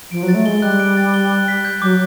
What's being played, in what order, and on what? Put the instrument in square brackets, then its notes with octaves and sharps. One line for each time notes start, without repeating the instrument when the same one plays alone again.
[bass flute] F3 [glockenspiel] D7
[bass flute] F#3
[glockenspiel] A6
[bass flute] A3
[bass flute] G#3 [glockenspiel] G7
[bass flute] G3 [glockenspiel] F#6
[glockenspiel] D7
A6
G7
F#6
B6
G6
[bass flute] F#3 [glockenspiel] D6